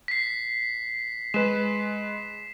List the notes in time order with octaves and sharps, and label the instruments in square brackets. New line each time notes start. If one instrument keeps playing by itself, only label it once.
[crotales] B6 C7
[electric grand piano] G#3 B4 [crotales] E7